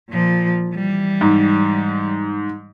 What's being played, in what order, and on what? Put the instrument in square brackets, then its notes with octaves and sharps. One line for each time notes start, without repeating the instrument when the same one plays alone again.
[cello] A#2 F3
E3 G3
[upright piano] G#2